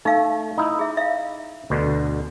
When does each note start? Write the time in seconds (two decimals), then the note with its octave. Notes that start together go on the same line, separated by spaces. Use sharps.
0.05 A3 D#4 F5
0.58 D#4 E4
0.79 G#4 E5
0.97 E5 F5
1.70 D2 B2 D3